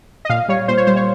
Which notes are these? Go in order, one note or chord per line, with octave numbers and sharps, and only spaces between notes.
D#5
A#2 F5
G3 C#5
A#2 C5
C#5
G3 C5
C#5